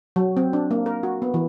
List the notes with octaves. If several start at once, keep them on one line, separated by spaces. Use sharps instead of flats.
F#3
C4
D4
A#3
A#4
F#4
B3
E3